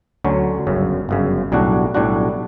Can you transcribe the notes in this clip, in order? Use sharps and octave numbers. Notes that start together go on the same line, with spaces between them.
D2 D3 F#3 C#4
G1 F#2 C#3
G1 F#2 C#3
B1 A2 G3 D4 F#4
B1 A2 G3 D4 F#4